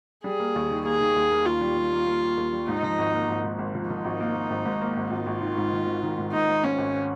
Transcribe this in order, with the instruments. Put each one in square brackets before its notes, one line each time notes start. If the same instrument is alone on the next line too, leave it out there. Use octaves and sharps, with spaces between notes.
[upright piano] G3 [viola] G#4
[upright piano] A#3
D#2
D#3
[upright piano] A#3 [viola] G#4
[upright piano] D#3
D#2
A#3
[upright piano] D#2 [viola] F4
[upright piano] G3
G3
A#3
A#3
A#3
D#2
G3
[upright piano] G#2 [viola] D#4
[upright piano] F3
G#1
A#3
G#1
G#2
G#1
F3
[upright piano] F3 [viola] D#4
[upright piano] G#1
A#3
A#3
G#1
G#2
A#3
G#1
[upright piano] G#1 [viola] F4
[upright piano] G#1
D#3
G#2
D#3
G#1
D#3
G#2
[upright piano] G#2 [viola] D#4
[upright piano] G#2
[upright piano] G#2 [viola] C#4
[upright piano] G#1